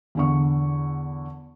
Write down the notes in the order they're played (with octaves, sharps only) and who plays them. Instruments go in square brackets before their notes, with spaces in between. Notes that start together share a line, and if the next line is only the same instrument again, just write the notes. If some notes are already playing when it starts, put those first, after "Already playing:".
[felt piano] E2 D3 C#6